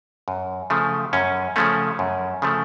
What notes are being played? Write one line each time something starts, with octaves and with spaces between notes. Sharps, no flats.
F#2
C#3 F3 A3
F#2 C#4
C#3 F3 A3 C#4
F#2
C#3 F3 A3